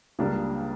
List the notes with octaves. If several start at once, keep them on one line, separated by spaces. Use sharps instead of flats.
C#2 C#3 G3 A#3 D4